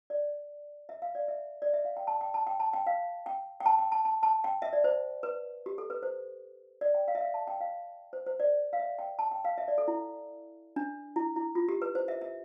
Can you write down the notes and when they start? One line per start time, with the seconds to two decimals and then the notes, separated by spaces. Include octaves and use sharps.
0.10 D5
0.89 E5
1.02 F5
1.15 D5
1.28 E5
1.62 D5
1.73 E5
1.85 F5
1.97 G5
2.07 A5
2.21 G5
2.34 A5
2.47 G5
2.60 A5
2.73 G5
2.87 F5
3.26 G5
3.60 G5
3.66 A5
3.79 G5
3.92 A5
4.05 A5
4.23 A5
4.44 G5
4.62 E5
4.73 D5
4.84 C5
5.23 B4
5.66 G4
5.78 A4
5.90 B4
6.03 C5
6.81 D5
6.95 G5
7.08 F5
7.15 E5
7.21 F5
7.34 A5
7.48 G5
7.61 F5
8.13 C5
8.26 C5
8.40 D5
8.73 F5
8.79 E5
8.99 G5
9.19 A5
9.31 G5
9.45 F5
9.58 E5
9.68 D5
9.78 A4
9.88 E4
10.76 D4
11.16 E4
11.36 E4
11.55 F4
11.69 G4
11.82 B4
11.95 C5
12.08 E5
12.21 E5